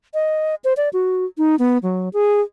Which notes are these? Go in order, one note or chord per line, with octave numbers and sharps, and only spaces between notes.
D#5
C5
D5
F#4
D#4
B3
F#3
G#4